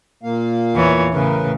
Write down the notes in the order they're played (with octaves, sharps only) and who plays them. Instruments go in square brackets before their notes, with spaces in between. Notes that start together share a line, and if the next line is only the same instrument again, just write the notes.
[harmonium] A#2 A#3 F5
[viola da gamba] E2 E3 C#5
[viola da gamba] A2 C#3 [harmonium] A#4 B4